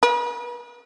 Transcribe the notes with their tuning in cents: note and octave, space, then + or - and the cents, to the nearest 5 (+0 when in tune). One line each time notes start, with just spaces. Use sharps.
B4 -45